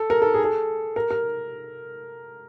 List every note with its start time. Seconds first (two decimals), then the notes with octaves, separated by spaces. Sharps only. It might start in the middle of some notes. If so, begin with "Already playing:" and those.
Already playing: A4
0.10 A#4
0.22 A4
0.34 G#4
0.44 A4
0.96 A#4
1.11 A#4